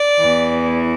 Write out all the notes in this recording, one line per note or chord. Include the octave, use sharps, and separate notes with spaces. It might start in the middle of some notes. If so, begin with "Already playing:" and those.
Already playing: D5
E2 E3